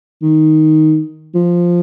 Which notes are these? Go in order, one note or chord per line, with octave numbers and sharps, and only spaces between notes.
D#3
F3